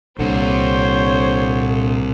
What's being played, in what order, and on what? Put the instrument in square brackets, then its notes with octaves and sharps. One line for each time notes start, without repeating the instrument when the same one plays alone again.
[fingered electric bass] C2 [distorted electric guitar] A#2 [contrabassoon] D3 [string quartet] C5 C#5